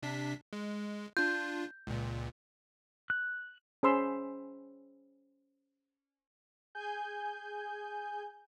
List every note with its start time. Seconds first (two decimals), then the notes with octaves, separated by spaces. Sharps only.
0.03 C3 D4 B6
0.53 G#3
1.17 D4 F4 G6
1.87 C#2 A#2
3.10 F#6
3.83 C#4 G#4 C5 B5 C6 E6
6.75 G#4 G#5 G6